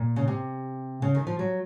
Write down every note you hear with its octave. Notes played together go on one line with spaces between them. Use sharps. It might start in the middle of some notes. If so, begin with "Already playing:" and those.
Already playing: A#2
C#3
C3
C#3
D#3
F3
F#3